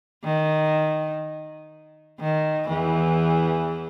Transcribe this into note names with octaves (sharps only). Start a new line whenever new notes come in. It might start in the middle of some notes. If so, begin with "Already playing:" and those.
D#3
D#3
E2 E3